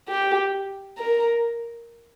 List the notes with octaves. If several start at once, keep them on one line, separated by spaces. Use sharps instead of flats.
G4
A#4